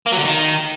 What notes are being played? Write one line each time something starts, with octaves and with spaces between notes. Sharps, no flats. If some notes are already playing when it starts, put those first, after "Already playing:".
A#3
F#3
D3
D#3